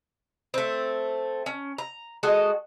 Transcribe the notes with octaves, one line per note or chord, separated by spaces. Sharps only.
A3 C4
C#4
A#5
G#3 F#4 A4 D#5